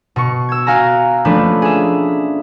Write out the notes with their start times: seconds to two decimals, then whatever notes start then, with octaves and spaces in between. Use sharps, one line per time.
0.16 B2 C#6
0.49 E6 G#6
0.67 F#4 F5 G#5 A#5
1.25 F3 A3 A#3 C#4 D4 B4
1.62 G#4 E5